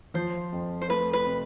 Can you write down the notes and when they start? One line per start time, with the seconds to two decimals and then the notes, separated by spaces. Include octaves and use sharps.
0.14 F3 C5
0.52 F2
0.81 C5
0.89 A3 B4
1.13 B4
1.26 C3